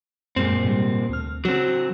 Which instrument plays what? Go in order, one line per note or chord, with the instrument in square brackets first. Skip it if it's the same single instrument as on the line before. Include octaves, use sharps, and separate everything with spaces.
[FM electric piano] F#2 G#3 [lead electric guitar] A#2 C4
[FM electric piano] G#2 C3 G3
D2 A3 F6
[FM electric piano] C#3 F#4 [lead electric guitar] F#3 C4